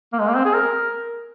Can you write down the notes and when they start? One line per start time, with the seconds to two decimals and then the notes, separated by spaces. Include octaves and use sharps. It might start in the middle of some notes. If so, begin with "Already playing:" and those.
0.13 A#3
0.19 G#3
0.28 A#3
0.36 C4
0.45 G#4
0.54 A#4